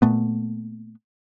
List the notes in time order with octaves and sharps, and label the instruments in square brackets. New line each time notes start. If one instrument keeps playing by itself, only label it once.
[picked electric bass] A#2 A3 B3